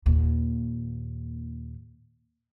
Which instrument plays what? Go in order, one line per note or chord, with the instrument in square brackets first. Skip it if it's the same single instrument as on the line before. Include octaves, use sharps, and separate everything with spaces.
[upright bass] D#2 A#2